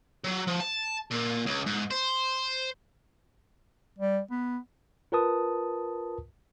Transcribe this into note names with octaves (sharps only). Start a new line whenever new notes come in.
F#3
F3
A5
A#2
C#2
G#2
C5
G3
B3
F4 A#4 B4 A5 D#6